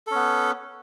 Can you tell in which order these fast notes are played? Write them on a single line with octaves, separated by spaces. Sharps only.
A4 C#4 B3